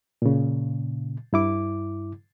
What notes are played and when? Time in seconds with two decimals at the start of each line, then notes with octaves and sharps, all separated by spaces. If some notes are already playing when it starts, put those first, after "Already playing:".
0.22 A#2 C#3
1.33 G2 E4 D6